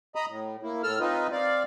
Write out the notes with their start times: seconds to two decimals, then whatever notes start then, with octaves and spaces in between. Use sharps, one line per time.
0.15 D#5 A#5 B5 D#6
0.28 A2
0.63 A#3 E4
0.83 A2 A4 E6 F6
1.00 C4 D#4 F4 B4 D#5
1.32 C4 D5 F5